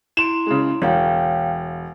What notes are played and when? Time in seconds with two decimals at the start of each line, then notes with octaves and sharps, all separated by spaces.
0.17 E4 C6 D7 E7
0.46 C#3 G#3
0.82 E1 C#5 F5 G5